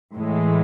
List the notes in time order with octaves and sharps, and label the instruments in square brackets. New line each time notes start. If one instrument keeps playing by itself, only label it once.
[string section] A2 E3 G#3